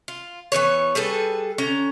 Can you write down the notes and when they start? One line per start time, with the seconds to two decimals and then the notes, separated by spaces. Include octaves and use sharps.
0.08 F4
0.52 E3 F3 B3 C#5
0.95 G3 G#4 A4 B4
1.58 D3 C#4 A#5